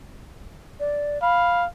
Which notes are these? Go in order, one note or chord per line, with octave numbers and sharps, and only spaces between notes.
D5
F5 B5